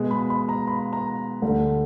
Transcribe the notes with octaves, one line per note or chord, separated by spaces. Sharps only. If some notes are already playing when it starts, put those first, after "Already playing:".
Already playing: B2 G#3 B3
B5
B5
A#5
B5
A#5
D2 D3 G3